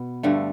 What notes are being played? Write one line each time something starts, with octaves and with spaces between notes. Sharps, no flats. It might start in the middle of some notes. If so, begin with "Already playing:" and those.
Already playing: B2 B3
G2 D3 A3